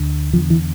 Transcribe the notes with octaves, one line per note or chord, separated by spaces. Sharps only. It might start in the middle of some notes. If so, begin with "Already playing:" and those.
Already playing: D2 D3
E2 D3 F3
E3